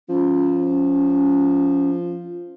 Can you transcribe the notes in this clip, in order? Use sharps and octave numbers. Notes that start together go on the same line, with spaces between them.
F3 C#4